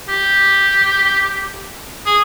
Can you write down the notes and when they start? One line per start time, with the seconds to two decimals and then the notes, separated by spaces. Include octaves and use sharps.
0.09 G4
2.06 G#4